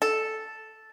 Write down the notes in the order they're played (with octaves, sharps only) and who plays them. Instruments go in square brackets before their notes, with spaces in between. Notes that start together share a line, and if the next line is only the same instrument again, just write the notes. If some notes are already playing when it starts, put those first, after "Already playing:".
[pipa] A4